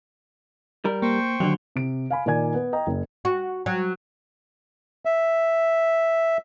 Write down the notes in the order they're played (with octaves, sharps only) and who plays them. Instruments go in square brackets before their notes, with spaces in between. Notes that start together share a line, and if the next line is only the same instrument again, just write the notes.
[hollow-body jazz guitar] G3 A#4
[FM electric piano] A#3 [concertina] C5 G5 C#6
[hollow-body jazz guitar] D#2 D3 [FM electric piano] F#3
[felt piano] C3 D7
F5 G#5 B5
A#2 D#3 A#4 D5 G#5 G#6
B3
D#5 G5 A#5
F#1
[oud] F#4
F#3
[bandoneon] E5